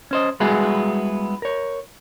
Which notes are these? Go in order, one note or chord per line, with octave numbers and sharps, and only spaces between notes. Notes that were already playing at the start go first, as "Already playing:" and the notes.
C#4 C5 D#5
G3 G#3 B3 E4 F#4 G#4
A#4 C#5